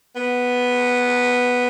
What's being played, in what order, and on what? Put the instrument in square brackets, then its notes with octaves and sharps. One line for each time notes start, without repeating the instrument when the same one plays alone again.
[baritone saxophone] B3